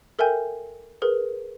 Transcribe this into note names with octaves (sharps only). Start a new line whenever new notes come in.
A4 A#4 E5 G5 G#5 G6
G#4 A#4 B4